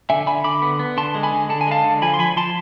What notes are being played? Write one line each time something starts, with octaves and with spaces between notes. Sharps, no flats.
D3 E5 G#5
D3 G#5 B5
D3 B5 D6
B3
B3
D3 A5 C6
G#3
G#5 B5
D3
D3 A5
G#5
G#3 F5 A5
D3
F3 G#5 B5
C6
F3 G#5 B5
F3 A5 C6